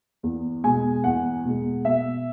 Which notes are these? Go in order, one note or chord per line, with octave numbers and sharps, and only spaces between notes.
E2
B2 G#3 G#5
E2 F#5
B2 G#3
B2 E5